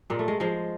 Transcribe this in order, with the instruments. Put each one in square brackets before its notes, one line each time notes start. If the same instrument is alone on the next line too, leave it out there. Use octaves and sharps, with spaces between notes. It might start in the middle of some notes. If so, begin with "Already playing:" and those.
[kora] A#2 G#3
A3
G#3
F3 G#3